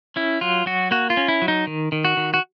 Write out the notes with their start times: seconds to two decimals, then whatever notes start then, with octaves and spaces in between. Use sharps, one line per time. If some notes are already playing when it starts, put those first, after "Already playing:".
0.16 C#4 E4
0.41 F#3 F4
0.66 F#3 F#4
0.91 A#3 F#4
1.10 F4
1.17 C#4
1.28 E4
1.42 F#3
1.48 D#4
1.67 D#3
1.92 D#3
2.05 F#4
2.17 D#3
2.34 F#4